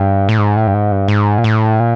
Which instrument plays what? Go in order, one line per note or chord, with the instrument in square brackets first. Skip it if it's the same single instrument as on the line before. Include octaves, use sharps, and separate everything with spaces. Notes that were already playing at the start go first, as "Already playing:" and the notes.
Already playing: [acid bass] G2
A2
G#2
A2
G2
G#2
G2
G#2
A#2
A2
A#2